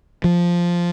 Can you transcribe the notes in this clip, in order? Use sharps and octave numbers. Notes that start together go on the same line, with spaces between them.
F3